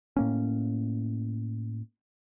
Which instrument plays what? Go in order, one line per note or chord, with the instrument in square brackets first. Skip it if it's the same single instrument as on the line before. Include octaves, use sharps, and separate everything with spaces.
[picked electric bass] A2 A#3 C#4